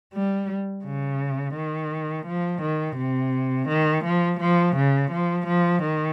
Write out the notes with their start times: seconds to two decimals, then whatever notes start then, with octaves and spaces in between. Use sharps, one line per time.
0.14 G3
0.84 C#3
1.55 D#3
2.26 F3
2.62 D#3
2.98 C3
3.69 D#3
4.05 F3
4.40 F3
4.76 C#3
5.11 F3
5.47 F3
5.83 D#3